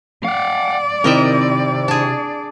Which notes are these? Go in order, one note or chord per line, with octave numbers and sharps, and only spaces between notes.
D5 F5 F#5
C3 D#3 C4 E4 A#4 D#5 E5
D4 G#4